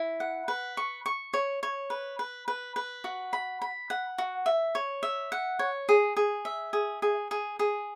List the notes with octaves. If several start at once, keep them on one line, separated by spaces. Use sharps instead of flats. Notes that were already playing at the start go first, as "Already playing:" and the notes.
Already playing: E4
F#5
B4
C#6
C#6
C#5
C#5
B4
B4
B4
B4
F#4
B5
B5
F#5
F#4
E5
C#5
E5
F#5
C#5
G#4
G#4
E5
G#4
G#4
G#4
G#4